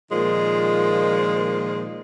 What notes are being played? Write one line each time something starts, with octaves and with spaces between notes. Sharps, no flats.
A#2 D#3 F3 G#3